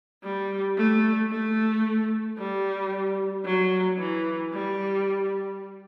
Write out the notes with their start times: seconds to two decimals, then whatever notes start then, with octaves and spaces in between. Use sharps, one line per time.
0.23 G3
0.77 A3
1.31 A3
2.38 G3
3.45 F#3
3.99 E3
4.53 G3